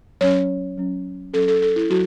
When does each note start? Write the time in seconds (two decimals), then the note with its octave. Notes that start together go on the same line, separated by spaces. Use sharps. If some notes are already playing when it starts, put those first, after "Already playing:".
0.21 F#3 C#4 C#5
0.78 F#3 C#4
1.33 F#3 C#4 A4
1.48 A4
1.62 A4
1.76 E4
1.90 F#3 F#4